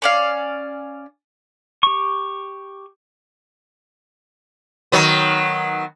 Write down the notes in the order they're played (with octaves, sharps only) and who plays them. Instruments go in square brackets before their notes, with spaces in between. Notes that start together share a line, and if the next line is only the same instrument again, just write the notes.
[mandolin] C#4 D5 F5
[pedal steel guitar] G4 C#6
[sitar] D#3 F#3 B3